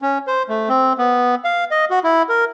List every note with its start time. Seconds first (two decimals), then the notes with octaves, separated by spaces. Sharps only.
0.02 C#4
0.27 C5
0.49 A3
0.69 C4
0.98 B3
1.45 F5
1.71 D#5
1.90 F#4
2.04 E4
2.29 A#4